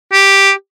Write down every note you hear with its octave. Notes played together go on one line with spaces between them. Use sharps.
G4